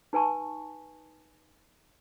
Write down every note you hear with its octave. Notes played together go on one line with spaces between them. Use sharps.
D#4 B4 G#5 A5 C#6